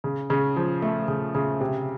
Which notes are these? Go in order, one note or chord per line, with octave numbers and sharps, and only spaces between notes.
C#3
C#3
F3
A3
C#3
C#3
C3